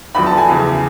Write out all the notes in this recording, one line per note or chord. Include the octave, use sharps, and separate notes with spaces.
E2 D3 F#3 B5
A5
G#5
E2 C#3 E3